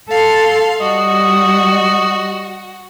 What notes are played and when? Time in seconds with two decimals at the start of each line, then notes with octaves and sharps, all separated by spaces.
0.10 A4 F5 C6
0.81 G3 F#4 D#5